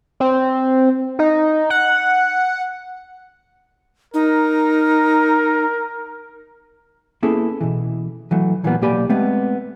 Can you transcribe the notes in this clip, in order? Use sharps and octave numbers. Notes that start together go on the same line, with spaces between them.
C4
D#4
F#5
D#4 A#4
A#3 B3 C#4 E4 G#4 A4
B2 E3
E3 F#3 A3
A#2 E3 F#3 G3 A#3 B3
B1 A#3 G4 D5 G#5 B5
G#3 A3 B3 C4